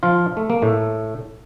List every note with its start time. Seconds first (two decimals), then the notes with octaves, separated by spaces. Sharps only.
0.03 F3 F4
0.37 A3
0.50 A#3
0.62 A2 A3